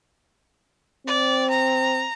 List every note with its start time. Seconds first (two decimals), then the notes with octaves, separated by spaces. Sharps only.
1.07 C4 D5
1.50 A#5